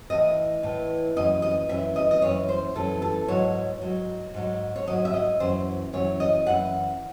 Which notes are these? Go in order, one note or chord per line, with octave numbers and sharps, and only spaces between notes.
A2 E3 D#5
A2 E3
F#2 E3 D#5
D#5
F#2 E3 E5
D#5
D#5
F#2 E3 C#5
C5
F#2 E3 A4
A4
G#2 F#3 C#5
G#2 F#3
G#2 F#3
C#5
G#2 F#3 D#5
E5
D#5
F#2 E3 C5
F#2 E3 C#5
D#5
F#2 E3 F#5